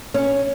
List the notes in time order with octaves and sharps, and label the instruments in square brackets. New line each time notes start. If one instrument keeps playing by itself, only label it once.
[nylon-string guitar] C#4